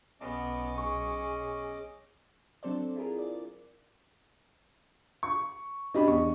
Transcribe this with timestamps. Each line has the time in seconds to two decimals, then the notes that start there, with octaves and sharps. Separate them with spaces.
0.21 B1 B3 C#4 D#5 D6
0.78 G#4 C#6
2.63 F#3 C4 D4 A4 C5 D5
2.96 E4 F4 G#4 A#4
3.18 D5
5.23 C#6
5.94 C#4 D4 G4 D#5 B5
6.08 E2 C#6